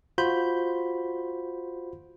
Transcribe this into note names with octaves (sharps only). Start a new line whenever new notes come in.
F4 F#4 C5 B5 G6